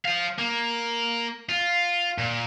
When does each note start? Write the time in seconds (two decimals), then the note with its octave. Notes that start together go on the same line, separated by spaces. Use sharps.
0.05 C5 F5
0.39 A#3
1.49 F4
2.18 A#2